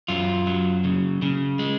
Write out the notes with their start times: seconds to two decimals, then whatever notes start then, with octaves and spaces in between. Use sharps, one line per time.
0.08 F#2 F4
0.47 F#3
0.84 C#3
1.22 C#3
1.59 G#3